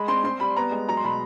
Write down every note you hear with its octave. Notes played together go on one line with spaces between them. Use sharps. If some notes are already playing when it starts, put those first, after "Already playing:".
Already playing: G#3 B5
C4 C6
C4 C6
G3 B5
B3 A#5
G#3
F#3 A#5
C6
B2 B5